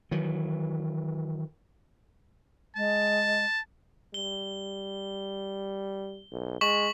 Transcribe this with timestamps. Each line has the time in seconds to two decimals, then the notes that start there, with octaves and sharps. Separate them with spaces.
0.11 D#3 E3 F#3
2.76 G#3 A5
4.14 G3 G7
6.32 B1
6.61 G#3 C#6 B6 F#7